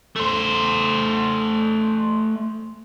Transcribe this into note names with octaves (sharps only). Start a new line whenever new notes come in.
A3 C5